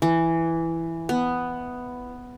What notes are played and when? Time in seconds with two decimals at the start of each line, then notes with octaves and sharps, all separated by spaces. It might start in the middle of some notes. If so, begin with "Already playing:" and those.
0.02 E3
1.09 B3